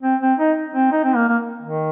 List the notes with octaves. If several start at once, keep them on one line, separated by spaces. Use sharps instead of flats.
C4
C4
D#4
C4
D#4
C4
A#3
A#3
D#3